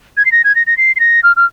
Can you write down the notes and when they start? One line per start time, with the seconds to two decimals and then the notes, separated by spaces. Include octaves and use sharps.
0.17 G#6
0.25 C7
0.32 A#6
0.44 G#6
0.55 A#6
0.67 A#6
0.77 C7
0.96 C7
1.00 A#6
1.23 F6
1.36 F6